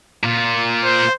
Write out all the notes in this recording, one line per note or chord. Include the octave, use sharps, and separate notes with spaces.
A#2 F4
C5